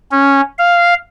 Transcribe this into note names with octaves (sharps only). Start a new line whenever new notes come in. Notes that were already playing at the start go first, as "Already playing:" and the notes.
C#4
F5